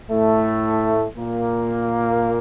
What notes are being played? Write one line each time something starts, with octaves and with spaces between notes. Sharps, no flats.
A2 A3
A#2 A#3